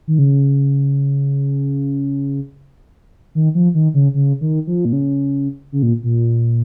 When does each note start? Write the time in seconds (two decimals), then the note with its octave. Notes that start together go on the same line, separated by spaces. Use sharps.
0.07 D#3
0.19 C#3
3.35 D#3
3.55 F3
3.74 D#3
3.94 C#3
4.14 C#3
4.41 D#3
4.67 F3
4.85 A#2
4.93 C#3
5.72 C#3
5.82 A#2
6.03 A#2